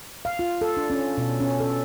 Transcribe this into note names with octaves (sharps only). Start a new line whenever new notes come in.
F5
F4
A4
D4
C#4
B2
C#4
A4